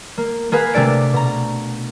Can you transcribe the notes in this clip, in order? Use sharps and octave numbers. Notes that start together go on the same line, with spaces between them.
A#3
A#3 G#4 B4 F5
C3 A3 D4 D5 D7
B2 A#5